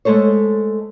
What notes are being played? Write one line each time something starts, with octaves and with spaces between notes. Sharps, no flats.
G#3 A3 A4 C5 C#5